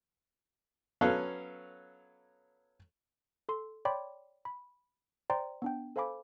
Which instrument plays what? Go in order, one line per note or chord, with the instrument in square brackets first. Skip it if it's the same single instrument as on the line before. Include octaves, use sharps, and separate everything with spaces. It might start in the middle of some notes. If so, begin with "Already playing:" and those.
[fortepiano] F#3 B3 C#4 A4 F5
[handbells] A4 C6
C#5 D5 G5 B5 C6 D6
B5
C5 D5 G5 A#5 C6
B3 D4 G5
A4 C5 F5 G#5 B5 D6